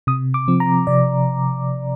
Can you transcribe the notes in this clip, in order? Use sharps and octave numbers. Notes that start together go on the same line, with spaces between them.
C3 D#6
D6
F3 C4
A#5
C3 D5